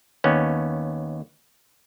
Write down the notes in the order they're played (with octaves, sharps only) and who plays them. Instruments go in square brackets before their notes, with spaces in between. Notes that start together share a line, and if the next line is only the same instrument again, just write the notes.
[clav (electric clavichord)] D#2 B3 C#4